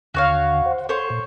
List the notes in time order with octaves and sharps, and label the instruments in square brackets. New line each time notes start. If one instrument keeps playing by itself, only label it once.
[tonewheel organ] D#2 D3 [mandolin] F#4 C#5 F5
[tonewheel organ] C5 F#5
[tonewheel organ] A4 C6 [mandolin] C5 C#5
[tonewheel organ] A#2